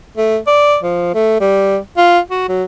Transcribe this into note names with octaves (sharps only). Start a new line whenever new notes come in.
A3
D5
F3
A3
G3
F4
F#4
F#3